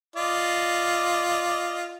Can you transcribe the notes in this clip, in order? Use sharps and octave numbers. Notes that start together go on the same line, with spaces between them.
F4 D5 D#5